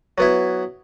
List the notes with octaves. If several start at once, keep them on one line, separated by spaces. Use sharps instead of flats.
F#3 B3 E4